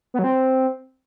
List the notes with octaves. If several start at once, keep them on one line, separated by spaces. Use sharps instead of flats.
B3
F#3
C4